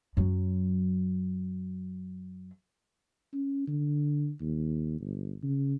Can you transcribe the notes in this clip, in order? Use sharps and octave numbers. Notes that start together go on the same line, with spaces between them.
F#2 F#3
C#4
D3
D#2
G1
C#3